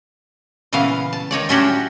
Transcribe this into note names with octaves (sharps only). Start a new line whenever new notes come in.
A#2 C#3 E3 B3 F5
A5
D#3 D#4 C#5 D5
A2 F#3 C#4 D4 F#4 G4